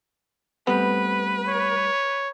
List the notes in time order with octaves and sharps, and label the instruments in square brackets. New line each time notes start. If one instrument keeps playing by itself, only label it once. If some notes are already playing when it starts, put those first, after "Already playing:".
[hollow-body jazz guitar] G3 A3 C4 [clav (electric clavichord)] B3 [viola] B4
[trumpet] C#5